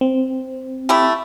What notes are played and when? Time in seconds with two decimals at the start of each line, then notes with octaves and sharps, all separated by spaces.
0.01 C4
0.89 A3 E4 G4